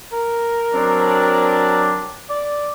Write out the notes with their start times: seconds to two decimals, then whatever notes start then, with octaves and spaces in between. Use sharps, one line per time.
0.13 A#4
0.74 F#3 C4 D4
2.29 D5